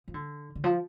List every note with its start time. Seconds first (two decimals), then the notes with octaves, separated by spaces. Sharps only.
0.08 F3
0.14 D3
0.55 D3
0.64 F3